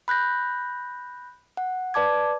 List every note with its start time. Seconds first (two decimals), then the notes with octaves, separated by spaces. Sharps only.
0.08 B5 F#6 G6 A#6
1.57 F#5
1.94 B4 D5 A5 D6 G#6